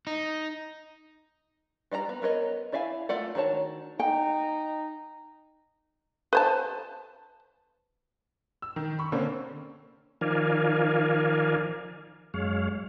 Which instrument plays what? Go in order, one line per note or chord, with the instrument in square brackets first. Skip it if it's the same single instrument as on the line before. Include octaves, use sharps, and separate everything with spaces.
[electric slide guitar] D#4
[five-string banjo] G3 D5 D#5 A#5
B3
B3 A#4 C#5 D#5
E4 D5 E5 F5 G#5
A3 F4 D5 F#5
D#3 D4 F#4 C#5 A5
[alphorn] D#4 [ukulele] G5
[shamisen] B4 C5 A5
[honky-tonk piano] E6
D#3
B5 C#6
D3 A#3 C4 C#4
[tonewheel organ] D#3 F3 A#4 D5 F5 G#5
F#2 G#3 C#5 F5